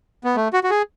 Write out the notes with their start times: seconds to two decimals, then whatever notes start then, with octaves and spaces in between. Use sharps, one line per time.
0.24 B3
0.36 A3
0.53 F#4
0.64 F#4
0.70 G#4